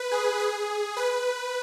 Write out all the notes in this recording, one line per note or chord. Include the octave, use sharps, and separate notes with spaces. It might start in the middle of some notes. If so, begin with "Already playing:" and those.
Already playing: B4
G#4
G#4
B4